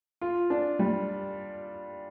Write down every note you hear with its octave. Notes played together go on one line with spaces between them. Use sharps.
F4
D4
G3